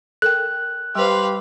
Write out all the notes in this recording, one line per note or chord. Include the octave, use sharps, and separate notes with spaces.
A4 A#4 G5 F#6
G3 G4 B4 C5 F5 C6